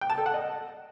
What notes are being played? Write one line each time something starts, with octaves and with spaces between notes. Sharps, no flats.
G5
A5
A4
F#5
D#5